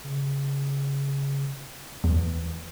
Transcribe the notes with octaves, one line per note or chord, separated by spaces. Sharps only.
C#3
E2 E3